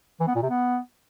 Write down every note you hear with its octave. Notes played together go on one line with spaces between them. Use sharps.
E3
B3
A#2
C3
B3